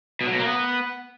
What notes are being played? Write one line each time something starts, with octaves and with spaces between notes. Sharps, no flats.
B2
F#3
B2
A#3
B3